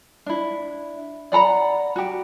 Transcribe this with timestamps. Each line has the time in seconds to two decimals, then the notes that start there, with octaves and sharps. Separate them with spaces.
0.26 D4 E4
1.32 D5 F#5 A#5 B5
1.96 F#4 G4